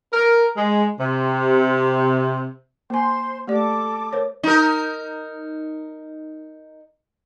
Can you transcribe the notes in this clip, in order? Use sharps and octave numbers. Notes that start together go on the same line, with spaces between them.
A#4
G#3
C3
A#3 C5 G#5 C6
A3 G4 A4 D5 D6
A#4 C5 C#5
D#4 A#4